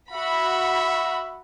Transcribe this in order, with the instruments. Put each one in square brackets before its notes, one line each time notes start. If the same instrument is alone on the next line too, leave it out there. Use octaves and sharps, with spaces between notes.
[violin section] F#4 F#5 B5 [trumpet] E5